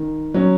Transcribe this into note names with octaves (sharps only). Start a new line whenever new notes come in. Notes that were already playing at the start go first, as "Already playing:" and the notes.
Already playing: D#3
F#3 C#4